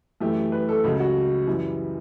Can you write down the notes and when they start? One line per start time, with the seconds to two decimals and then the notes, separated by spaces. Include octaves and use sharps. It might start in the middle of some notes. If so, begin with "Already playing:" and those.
0.20 F#2 E3 A3 G4
0.52 B4
0.69 A4
0.84 C#2 C#3 F#3 G4
1.00 F#4
1.47 F#2 E3 G3